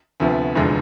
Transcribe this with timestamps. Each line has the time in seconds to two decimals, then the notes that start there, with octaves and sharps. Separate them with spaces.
0.20 D2 C3 F3 B3
0.55 F1 E2 D3 F3 G#3